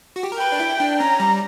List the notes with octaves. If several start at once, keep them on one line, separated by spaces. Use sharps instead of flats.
F#4
G4
A#4
B4 G5
D4
E4
D4
C#4 A#5
G3